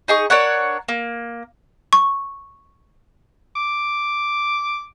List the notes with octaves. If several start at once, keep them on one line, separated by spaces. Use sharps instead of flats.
D#4 G#4 C#6
D4 A#4 C#5 F#5
A#3
C#6
D6